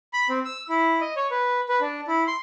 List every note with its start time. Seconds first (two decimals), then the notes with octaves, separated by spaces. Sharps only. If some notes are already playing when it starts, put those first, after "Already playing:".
0.13 B5
0.29 C4
0.45 E6
0.69 E4
1.01 D#5
1.16 C#5
1.31 B4
1.69 B4
1.81 D4
2.08 E4
2.27 C6